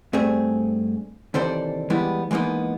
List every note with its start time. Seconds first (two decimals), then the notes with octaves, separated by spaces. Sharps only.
0.13 G2 A3 C4 G#4
1.34 D#2 C3 E3 A4 C5 D5
1.90 E3 G3 G#3 B3 E4
2.31 E3 G#3 A#3 B3 D#4